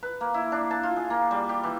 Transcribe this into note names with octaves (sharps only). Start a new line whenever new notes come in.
B4
A#3
E4
D4
A5
F4
G#4
A#3
G3
G4
E3